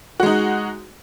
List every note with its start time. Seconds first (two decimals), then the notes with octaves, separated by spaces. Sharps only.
0.20 F#4
0.23 G#3
0.26 D#4